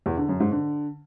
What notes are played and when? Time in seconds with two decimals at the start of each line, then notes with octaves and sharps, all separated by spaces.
0.06 E2
0.17 D3
0.29 F#2
0.40 G#2
0.52 D3